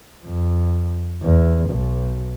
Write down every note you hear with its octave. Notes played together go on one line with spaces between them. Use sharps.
F2
E2
B1